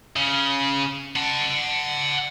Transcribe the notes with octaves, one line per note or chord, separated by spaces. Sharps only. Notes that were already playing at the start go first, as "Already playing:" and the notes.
C#3
F#5 A5